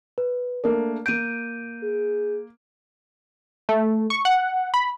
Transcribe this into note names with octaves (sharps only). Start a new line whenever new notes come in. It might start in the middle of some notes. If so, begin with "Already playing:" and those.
B4
A3 A#3 D4 A#4
A#3 G6 D7 D#7
G#4
A3
C#6
F#5
B5